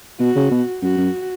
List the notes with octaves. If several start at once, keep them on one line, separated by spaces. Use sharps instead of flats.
B2 F#4
C#3
B2
F#2 F#4
F#2